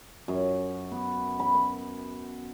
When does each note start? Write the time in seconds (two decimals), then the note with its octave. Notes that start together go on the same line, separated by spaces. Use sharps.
0.28 F#2
0.91 B3
1.40 B5
1.55 B5